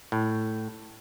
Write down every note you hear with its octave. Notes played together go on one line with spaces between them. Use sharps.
A2